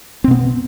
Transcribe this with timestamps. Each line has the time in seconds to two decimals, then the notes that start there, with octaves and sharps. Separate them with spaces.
0.24 C4
0.28 B2
0.31 B3